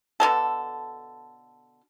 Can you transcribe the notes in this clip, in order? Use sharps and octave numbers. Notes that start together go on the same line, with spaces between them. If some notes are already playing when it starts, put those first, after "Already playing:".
B2 D3 F#3 A4